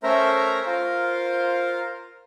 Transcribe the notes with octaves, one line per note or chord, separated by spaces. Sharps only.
A3 C#4 A#4 C5 E5 A#5
F4 A#4 C5 F5